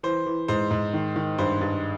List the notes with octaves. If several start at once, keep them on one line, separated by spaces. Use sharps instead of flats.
E3 C5
E3
G#2 C5
G#2
D#3
D#3
G2 C5
G2